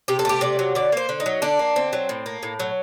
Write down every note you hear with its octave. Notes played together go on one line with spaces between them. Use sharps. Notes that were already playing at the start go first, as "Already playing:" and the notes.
C3 G4
A4
A3 G4
C3 D5
F#3
D3 D5
A#3 C5
D3
D#4
F#3
D3 D4
A#3
D3 C4
F#3
A2
A#3
A2
F#3